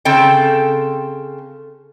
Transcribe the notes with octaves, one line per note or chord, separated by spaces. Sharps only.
C#3 C4 A4 G5